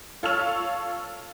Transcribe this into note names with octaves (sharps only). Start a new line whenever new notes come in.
F4 A4 C#5 E6 F6 F7